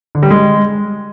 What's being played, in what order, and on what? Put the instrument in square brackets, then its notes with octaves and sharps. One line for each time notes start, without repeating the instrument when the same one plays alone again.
[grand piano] D3
G3
G#3